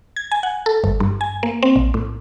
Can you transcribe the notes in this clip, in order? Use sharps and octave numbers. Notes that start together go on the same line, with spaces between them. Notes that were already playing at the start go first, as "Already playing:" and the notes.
G#6
G#5
F#5
A4
G1
G2
G#5
A#3
C4
A#1
A2